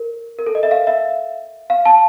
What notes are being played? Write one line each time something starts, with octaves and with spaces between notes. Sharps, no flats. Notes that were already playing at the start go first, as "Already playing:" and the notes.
Already playing: A#4
A#4
A4
D#5
E5
F5
E5
F5
A5